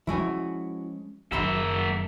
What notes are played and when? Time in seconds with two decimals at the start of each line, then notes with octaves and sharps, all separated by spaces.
0.07 F3 G#3 C#4 E4 F#4 G#5
1.32 F#1 F#2 D#3 A#3 E5 B5 C6